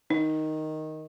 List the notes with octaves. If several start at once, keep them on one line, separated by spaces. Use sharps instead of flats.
D#3 D#4